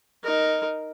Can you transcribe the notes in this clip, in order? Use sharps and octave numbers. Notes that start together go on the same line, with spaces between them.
D#4 A#4